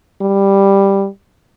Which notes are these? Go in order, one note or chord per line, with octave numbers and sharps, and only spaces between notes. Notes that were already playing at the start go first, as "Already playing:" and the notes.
G3